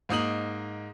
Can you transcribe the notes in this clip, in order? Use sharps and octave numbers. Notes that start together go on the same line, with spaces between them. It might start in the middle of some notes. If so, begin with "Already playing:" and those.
G#2 A#3 D#4 D#6 F#7